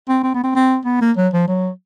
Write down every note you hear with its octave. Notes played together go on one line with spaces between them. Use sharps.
C4
C4
B3
C4
C4
B3
A#3
F#3
F3
F#3